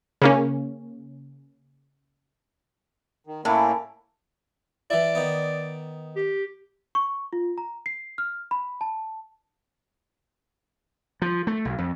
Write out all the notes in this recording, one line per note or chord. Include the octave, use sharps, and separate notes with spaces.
C#3 A#3 C#4
D#3
A2 A#3 C#4 E4
E3 E4 D5
D#3 B3
G4
C#6
F4
A#5
C7
F6
B5
A5
F3
A3
B1
F2